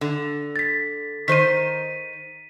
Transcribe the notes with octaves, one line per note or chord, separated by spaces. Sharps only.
D3
A6 B6
D#3 C5 B6 D#7